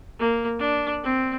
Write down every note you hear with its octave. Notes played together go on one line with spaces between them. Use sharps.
A#3
D4
C4